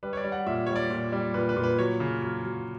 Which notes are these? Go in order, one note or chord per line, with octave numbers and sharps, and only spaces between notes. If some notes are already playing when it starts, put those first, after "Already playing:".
G3 B4
C#5
D5
G3
F#5
A#2 E5
G3 C#5
D5
A#2
G3
A#2 B4
B4
A#2
B4
F#3 C#5
C#3
F#3
F#3